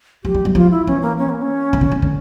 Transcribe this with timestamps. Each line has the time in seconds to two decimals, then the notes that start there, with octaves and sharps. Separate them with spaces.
0.24 F3 G4
0.35 G3
0.45 G3
0.55 F3 F4
0.71 E4
0.87 E3 C#4
1.02 A#3
1.19 C#4
1.29 A#3
1.42 C#4
1.73 C#3
1.81 D3
1.92 C#3
2.02 D3